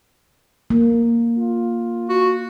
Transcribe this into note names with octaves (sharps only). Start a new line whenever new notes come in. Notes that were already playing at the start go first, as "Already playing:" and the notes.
A#3
F4
F#4